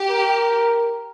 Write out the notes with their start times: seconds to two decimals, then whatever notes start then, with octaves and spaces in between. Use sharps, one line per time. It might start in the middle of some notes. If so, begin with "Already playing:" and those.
Already playing: G4
0.10 A#4